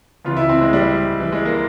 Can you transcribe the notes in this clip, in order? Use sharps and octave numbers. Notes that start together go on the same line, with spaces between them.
C#2 C3 E3 F4
E4
C4
G#3
G3
E3
G#3
A#3